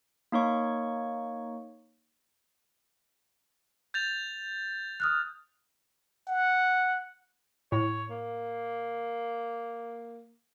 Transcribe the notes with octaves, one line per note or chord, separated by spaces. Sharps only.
A#3 D#4 C#5 C#6
G6 A6 F7
D#6 F6 F#6
F#5
A2 C#5
A#3